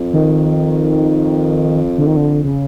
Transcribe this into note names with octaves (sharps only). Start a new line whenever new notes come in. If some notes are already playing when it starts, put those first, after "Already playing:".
Already playing: F2
D#3
D3
D#3
D3
C#3